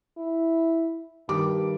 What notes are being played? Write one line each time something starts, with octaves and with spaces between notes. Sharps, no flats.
E4
G2 D#3 G3 D6